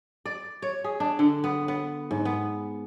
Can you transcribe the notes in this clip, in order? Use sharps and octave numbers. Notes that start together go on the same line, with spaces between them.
D5
C#5
G#4
D4
D3
B3
B3
G#2
B3